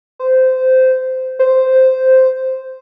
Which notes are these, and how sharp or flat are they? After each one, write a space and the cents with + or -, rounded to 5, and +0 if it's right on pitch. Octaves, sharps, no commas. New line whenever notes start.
C5 -15
C5 -5